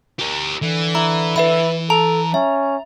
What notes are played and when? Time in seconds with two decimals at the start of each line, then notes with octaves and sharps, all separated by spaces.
0.19 G4 A#4
0.62 D3 E3
0.95 E4 A#5
1.36 E3 B4 E5 B5
1.90 A4 A5 A#5
2.34 C#4 E5